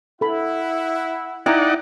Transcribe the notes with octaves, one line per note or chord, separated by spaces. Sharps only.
E4 A4 F#5 B5
D#4 E4 D5 F#5 G5 A#5